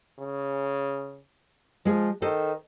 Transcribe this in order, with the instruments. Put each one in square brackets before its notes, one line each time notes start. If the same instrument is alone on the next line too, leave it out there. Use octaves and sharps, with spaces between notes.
[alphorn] C#3
[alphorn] F3 [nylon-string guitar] G#3 G#4
[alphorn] D#3 [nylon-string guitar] A4 C5 D#5